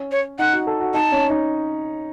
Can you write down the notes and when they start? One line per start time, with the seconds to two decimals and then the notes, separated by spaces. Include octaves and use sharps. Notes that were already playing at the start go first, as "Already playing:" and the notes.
Already playing: C#4
0.12 C#5
0.39 D#4 F#5
0.53 F#4
0.67 A4
0.80 F#4
0.94 D#4 A5
1.12 C#4
1.30 D#4